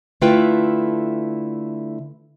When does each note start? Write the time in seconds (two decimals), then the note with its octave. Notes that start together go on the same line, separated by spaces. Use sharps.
0.21 D3 A3 E4 F4 B4 G5